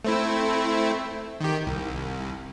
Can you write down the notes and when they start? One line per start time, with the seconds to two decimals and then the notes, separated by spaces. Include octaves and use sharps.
0.05 A3 C4 E4
1.40 D#3 G4
1.67 C2